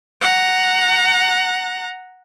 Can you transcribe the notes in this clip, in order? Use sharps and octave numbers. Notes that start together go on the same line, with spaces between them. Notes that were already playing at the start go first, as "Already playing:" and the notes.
F#5 A#5